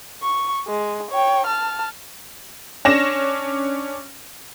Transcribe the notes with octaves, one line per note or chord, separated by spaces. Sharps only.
C#6
G#3
C#5 G5
A5 F6
C#4 D4 A#6 E7